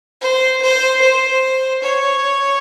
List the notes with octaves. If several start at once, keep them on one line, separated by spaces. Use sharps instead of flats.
C5
C5
C5
C#5